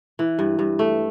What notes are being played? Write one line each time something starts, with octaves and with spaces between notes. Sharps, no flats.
E3
G2
G2
A3